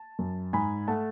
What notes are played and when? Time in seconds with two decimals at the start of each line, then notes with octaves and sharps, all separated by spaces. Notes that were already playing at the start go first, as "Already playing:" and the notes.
Already playing: A5
0.19 F#2
0.53 G#2 G#5 B5
0.88 A3 F#5 A5